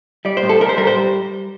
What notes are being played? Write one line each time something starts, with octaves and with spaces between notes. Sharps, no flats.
G3 D5
C5
A2
A4
G3 A#4
C5
G3 A#4
C5